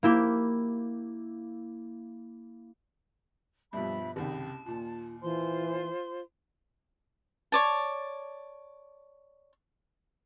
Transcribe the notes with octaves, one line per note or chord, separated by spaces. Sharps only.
A#3 E4 G4
G2 B2 F3 G3 E5 B5
F#1 C2 D#3 G4 A5
D#2 A#2 F4
E3 F4 C5 C6
C#5 D5 A5